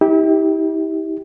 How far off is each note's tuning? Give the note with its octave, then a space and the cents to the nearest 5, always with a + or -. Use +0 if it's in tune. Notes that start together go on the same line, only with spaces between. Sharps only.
E4 -45 G4 +0